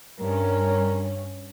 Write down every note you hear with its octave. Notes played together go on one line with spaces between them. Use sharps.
G2 C#4 A#4